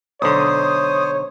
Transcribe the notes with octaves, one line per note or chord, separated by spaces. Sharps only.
B1 D3 C5 C#5 D#6